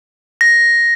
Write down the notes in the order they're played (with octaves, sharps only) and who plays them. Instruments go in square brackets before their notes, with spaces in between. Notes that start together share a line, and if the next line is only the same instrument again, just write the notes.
[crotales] A#6